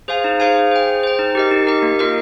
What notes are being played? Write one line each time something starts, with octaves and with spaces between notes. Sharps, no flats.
G#4 C5 F5 G#5
D#4
G#4 C5 F5 G#5
G#4
C5 G5
G#4
C5 G5
D#4
G4 A#4 D#5
D#4
G4 A#4 D#5
A#3
F4 A#4 D#5